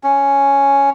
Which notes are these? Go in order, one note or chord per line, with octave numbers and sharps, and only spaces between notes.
C#4